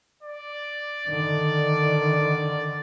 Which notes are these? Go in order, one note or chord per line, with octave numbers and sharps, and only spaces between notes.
D5
D3 D#3